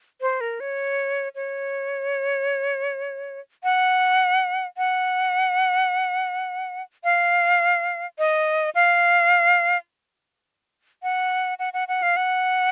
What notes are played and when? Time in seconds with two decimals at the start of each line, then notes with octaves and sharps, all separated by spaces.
0.21 C5
0.41 A#4
0.60 C#5
1.35 C#5
3.64 F#5
4.77 F#5
7.04 F5
8.19 D#5
8.75 F5
11.03 F#5
11.59 F#5
11.73 F#5
11.88 F#5
12.02 F5
12.17 F#5